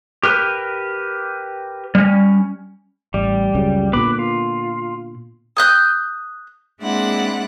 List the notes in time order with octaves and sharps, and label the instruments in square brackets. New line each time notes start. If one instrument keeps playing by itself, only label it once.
[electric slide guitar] G4 A#4 B4
G3 C#4
[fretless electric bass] A1 [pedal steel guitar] G3
[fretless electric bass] C#2 F#2 C#3
[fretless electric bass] A#2 D3 B3 [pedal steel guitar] B4 B5 D6
[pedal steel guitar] F4
[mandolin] D#6 F#6 G6
[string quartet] G#3 A#3 C4 D4 E4 F#5